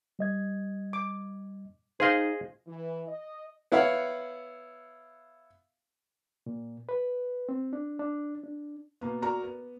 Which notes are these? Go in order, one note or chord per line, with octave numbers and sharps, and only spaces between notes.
G3 D#5 G#6
D6
D#4 G#4 C5 D#5 F5
E3
D#5
B3 E4 C#5 F5 F#5
A#2
B4
C4
D4
D4
D4
B2 A#3 B3
F#4 A#4 D5 A#5
B3